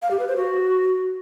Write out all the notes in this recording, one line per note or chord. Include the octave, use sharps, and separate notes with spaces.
F5
G4
B4
C5
F#4